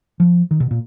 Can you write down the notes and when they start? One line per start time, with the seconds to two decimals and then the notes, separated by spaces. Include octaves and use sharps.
0.20 F3
0.51 D#3
0.60 B2
0.71 A#2